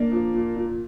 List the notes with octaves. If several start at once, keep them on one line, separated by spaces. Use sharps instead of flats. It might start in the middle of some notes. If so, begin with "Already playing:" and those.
Already playing: A#3 D4
F3
A#2
A#2